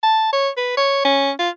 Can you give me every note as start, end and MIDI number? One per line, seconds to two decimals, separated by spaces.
0.03 0.29 81
0.33 0.49 73
0.57 0.76 71
0.77 1.01 73
1.05 1.31 61
1.39 1.49 65